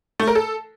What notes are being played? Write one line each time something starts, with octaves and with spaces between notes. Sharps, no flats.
A3
A#4
A4